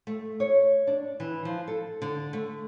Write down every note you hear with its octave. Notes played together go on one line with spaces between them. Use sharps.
A3
C#5
D4
E3
F3
A4
D3
A3